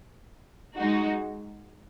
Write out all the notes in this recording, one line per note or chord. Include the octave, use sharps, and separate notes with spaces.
G#3 D#4 F#4